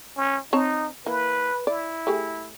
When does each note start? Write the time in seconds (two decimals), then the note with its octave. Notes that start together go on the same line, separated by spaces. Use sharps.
0.17 C#4
0.53 C4 D#4 C#5 A5
1.06 E3 A#3 B4
1.67 E4 D5
2.07 A3 G4 G#4